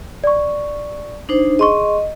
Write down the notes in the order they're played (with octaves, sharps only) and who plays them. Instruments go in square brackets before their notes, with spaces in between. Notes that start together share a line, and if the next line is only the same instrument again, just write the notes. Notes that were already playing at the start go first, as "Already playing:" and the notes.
[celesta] D5 C#6
[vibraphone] D4 D#4 C5
[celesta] G#4 C6 C#6 [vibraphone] D#5